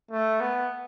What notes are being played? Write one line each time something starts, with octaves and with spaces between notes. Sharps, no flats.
A3
B3